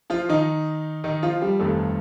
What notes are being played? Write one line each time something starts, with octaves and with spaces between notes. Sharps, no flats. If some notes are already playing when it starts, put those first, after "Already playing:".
F3 F4
D#3 D#4
D#3 D#4
F3 F4
G3 G4
G1 F2 D#3 A3 A4